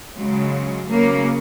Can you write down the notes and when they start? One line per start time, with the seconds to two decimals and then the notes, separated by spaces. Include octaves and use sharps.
0.17 C#3 F#3 G#3
0.89 C#3 F#3 A#3